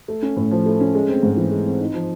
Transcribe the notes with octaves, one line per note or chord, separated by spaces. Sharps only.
A3
C#4
A2
F3
A3
C#4
G#3
C4
G#2
E3
G#3
C4
D#4
F3